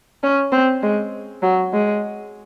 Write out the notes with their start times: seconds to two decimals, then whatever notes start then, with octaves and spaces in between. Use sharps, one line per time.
0.23 C#4
0.52 C4
0.83 G#3
1.42 F#3
1.73 G#3